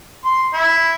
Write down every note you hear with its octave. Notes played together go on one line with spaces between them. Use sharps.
C6
E4